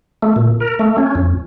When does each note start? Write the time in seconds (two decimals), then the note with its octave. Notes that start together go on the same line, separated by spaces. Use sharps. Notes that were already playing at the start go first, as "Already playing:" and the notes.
0.22 A3
0.36 A#2
0.60 A#4
0.79 A3
0.98 C#4
1.15 F2